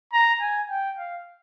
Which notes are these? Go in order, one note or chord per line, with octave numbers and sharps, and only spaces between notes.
A#5
G#5
G5
F5